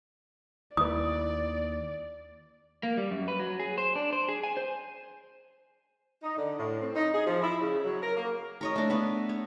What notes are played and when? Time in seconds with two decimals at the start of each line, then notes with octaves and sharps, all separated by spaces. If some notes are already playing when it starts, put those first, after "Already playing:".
0.77 D#2 E4 B4 D5 D#6
2.83 A#3
2.97 G3
3.11 F#2
3.28 B4
3.40 F#3
3.60 G#4
3.78 C5
3.96 D4
4.13 C5
4.29 G#4
4.44 G#5
4.57 C5
6.23 D#4
6.37 D3
6.59 A2
6.82 C4
6.96 D#4
7.14 G#4
7.26 F3
7.42 E4
7.60 C#3
7.84 F#3
8.03 A#4
8.17 A#3
8.61 A#4 C#5 D#5
8.76 A3 D4
8.90 B3 B4
9.29 C#5